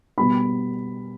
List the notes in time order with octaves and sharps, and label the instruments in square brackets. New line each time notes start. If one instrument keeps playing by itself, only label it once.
[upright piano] B2 G3 B3 B5